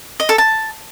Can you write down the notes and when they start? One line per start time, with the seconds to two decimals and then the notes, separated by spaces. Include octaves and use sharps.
0.20 D#5
0.29 A4
0.38 A5